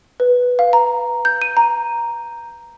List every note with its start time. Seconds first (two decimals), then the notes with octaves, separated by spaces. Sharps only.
0.20 B4
0.59 F5
0.73 A#5
1.25 G6
1.42 D#7
1.57 A#5